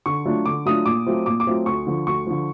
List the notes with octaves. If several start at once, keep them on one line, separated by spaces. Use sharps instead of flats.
D3 C#6
F#3 A3 D4 F4
D3 D6
F#3 A3 D4 F4 D#6
A#2 D6
F#3 A3 C4 F4
A#2 D6
D6
F#3 A3 C4 F4
D2 C#6
D3 F3
D2 C#6
D3 F3